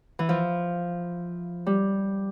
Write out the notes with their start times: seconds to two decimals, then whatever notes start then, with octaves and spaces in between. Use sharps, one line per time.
0.19 E3
0.29 F3
1.67 G3